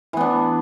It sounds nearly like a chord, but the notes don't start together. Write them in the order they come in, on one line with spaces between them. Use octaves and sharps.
E3 B3 D4